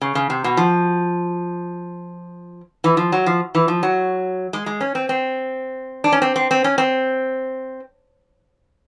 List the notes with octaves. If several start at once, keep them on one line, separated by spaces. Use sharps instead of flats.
C#3
C#3
C3
B2
F3
E3
F3
F#3
F3
E3
F3
F#3
G#3
G#3
C#4
C4
C4
D4
C#4
C4
C4
C4
C#4
C4